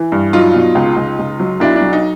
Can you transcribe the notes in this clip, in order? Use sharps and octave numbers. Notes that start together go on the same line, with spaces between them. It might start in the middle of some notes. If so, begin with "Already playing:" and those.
Already playing: E3
G2
F#3 D#4 F4
B2
C#2
C#2
C#2
F#3
B1 D4 E4
D4
F#3
D#4